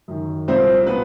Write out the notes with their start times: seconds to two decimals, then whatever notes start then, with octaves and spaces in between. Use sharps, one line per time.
0.08 F#2 D#3
0.48 C2 A#2 F3 C4 C5
0.87 A#2 F3 B3 B4